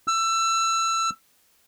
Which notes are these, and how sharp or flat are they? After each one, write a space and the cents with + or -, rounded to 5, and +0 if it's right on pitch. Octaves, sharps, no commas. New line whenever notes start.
E6 +20